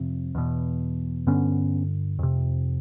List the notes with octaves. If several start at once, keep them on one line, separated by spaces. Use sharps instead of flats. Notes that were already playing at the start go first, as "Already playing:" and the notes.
Already playing: F2 C3
E2 B2
G2 D3 B3 C#4
F2 C3